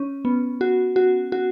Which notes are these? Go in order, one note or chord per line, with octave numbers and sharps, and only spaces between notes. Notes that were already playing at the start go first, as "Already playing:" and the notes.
Already playing: C#4
B3
F#4
F#4
F#4